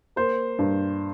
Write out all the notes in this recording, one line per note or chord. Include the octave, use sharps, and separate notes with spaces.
A#3 C5
G2